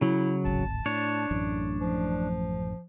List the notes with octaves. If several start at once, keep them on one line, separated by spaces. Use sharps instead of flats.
C#3 F#3 E4
D1 G#1 A5
A2 D4 C#5
A1 F#2 A2
F3